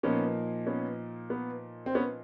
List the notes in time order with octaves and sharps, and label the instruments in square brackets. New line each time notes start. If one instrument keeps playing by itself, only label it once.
[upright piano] A#2 F3 A#3 D#4 [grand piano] B3 C#4
[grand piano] B3 C#4
B3
C4
B3 C#4